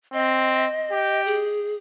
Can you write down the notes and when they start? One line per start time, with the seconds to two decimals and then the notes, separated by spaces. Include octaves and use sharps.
0.13 C4 D#5
0.92 G4
1.26 G#4